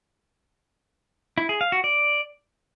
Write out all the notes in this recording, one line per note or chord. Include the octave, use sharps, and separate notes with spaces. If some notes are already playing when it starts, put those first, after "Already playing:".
E4
G#4
F5
F#4
D5